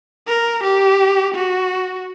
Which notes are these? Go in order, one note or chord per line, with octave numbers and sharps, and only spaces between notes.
A#4
G4
F#4